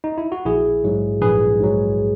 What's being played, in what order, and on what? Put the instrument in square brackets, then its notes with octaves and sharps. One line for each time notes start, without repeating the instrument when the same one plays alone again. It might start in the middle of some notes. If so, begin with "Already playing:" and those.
[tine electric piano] D#4
E4
F#4
A#1 E4 G#4
G#2 F#3
A#1 G#4 B4
G#2 F#3